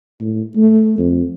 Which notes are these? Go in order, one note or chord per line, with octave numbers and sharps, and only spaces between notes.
A2
A3
F2